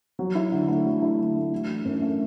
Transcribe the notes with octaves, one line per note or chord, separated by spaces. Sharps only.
F#3
E4
D3
A3
F#3
E4
D3
A3
E3
D4
F#2
A3